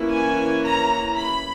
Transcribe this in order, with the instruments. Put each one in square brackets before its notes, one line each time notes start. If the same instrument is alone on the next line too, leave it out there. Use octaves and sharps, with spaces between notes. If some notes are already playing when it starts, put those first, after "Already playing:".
Already playing: [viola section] E3 A#3 C#4 E4
G#5
A#5
B5